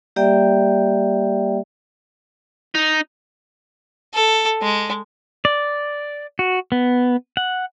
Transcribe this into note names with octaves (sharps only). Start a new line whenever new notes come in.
G3 A#3 G4 D5 E5 G5
D#4
A4
G#3
D5
F#4
B3
F#5